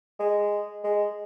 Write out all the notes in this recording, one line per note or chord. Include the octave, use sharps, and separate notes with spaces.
G#3
G#3